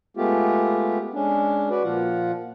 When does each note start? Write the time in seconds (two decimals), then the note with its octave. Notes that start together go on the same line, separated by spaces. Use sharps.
0.17 G#3 A3 B3 F4 G4
1.14 G#3 C#4 D4
1.70 F#4 B4 D5
1.84 A#2 F3 F4 F#5